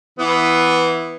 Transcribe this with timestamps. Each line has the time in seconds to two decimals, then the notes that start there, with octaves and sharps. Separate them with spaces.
0.19 E3 B3